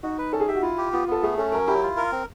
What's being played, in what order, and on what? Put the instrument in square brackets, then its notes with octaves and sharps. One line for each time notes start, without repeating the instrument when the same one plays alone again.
[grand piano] D#4 [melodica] F#4
[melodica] B4
[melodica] C#4 [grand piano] A4
[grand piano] G#4
[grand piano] G4 [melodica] E5
[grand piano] F#4
[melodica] E4 [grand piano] F4
[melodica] G4
[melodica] B3 [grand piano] F4
[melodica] B3 [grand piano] A4
[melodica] A3 [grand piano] G#4
[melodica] C#4 [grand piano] A4
[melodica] F#3 [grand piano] A#4
[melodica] E4 [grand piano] G4
[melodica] F4
A#4
C4